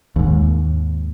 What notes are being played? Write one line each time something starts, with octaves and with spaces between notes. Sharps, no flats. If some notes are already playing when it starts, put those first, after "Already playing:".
D#2 G#2